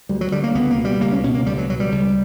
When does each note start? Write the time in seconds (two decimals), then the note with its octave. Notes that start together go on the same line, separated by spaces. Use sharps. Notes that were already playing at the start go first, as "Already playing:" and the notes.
0.09 D2 G3
0.21 F#3
0.32 D3 G3
0.43 A#3
0.55 C#2 B3
0.71 A#3
0.78 B2
0.85 G3
1.01 C#2 A#3
1.12 C#4
1.24 B2 C#4
1.35 A#3
1.46 C#2 G3
1.58 F#3
1.69 B2 F#3
1.80 G3
1.92 C#2